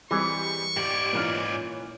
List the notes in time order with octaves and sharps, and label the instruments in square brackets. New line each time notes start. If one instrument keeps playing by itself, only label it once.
[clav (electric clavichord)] E3 G#4 [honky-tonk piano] G3 G#3 C4 [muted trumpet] C#6
[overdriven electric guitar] G#2 D5 [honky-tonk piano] G4
[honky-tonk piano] A#2 E3 C#4 [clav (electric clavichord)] F4 A#4 B4